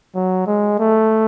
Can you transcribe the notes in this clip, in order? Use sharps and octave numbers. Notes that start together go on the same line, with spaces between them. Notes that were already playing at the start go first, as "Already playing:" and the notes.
F#3
G#3
A3